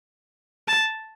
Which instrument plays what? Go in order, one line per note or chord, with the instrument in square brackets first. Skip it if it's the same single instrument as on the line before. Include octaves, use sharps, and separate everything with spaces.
[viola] A5